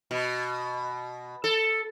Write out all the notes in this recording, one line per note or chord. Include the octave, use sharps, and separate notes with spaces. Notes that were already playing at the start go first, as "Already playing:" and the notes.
B2
A4